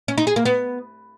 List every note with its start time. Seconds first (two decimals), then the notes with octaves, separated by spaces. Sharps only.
0.08 C#4
0.18 D#4
0.27 G#4
0.36 A#3
0.46 B3